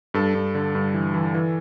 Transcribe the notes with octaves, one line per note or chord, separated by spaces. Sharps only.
G2 A4
G2
D3
G2
E3
E3
E3